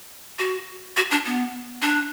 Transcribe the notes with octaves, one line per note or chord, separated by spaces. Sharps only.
F#4
F#4
D4
B3
D4